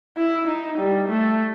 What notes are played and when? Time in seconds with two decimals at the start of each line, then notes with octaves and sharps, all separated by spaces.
0.17 E4
0.48 D#4
0.79 G3
1.09 A3